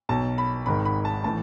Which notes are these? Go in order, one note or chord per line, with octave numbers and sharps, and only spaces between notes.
B1 B2 A5
B5
G#1 G#2 D#3 B5
B5
A5
A2 E3 A5